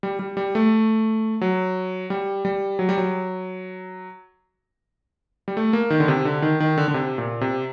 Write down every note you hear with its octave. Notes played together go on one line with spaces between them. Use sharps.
G3
G3
G3
A3
F#3
G3
G3
F#3
G3
F#3
G3
A3
A#3
D#3
D3
C3
D3
D#3
D#3
D3
D3
C3
A#2
C3